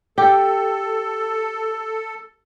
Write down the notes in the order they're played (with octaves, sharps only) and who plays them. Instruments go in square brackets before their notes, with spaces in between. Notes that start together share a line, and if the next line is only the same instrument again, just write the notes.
[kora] G4 [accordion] A4